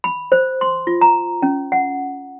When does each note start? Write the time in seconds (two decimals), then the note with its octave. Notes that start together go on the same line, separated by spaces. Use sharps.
0.04 B5
0.32 C5
0.61 C6
0.87 F4
1.01 A#5
1.42 C#4
1.72 F#5